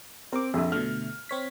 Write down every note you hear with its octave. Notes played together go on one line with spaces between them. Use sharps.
C4 A#4 D6
A#1 F2 E5
B2 D3 A3 F6
C4 C#5 B6